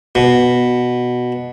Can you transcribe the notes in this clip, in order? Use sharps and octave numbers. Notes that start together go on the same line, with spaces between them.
B2